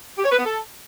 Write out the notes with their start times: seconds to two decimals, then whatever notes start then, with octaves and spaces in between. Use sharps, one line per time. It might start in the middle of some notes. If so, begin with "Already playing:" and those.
0.17 G4
0.24 C#5
0.31 B4
0.38 B3
0.44 A4